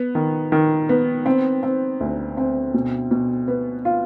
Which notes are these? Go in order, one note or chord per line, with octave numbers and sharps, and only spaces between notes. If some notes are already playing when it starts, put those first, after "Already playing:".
Already playing: B3
D#3
D#3
B3
C4
C4
D2
C4
B2
B2
B3
F4